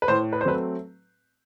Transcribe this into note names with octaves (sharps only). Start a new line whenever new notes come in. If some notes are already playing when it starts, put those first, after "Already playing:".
B4
A2 C5
B4
C5
F#3 A3 C4 B4